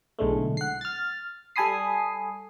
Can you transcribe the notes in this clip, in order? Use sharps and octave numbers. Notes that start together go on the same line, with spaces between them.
B1 A2 D3 G#3 A3
F#5 C7
F6 A6
G3 A4 G#5 B5 D#6 C7